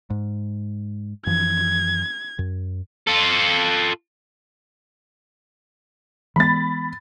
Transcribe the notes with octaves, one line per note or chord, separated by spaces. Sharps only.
G#2
F#2 E3 F3 G#6
F#2
F4 A4
E3 G#3 B3 B5 A6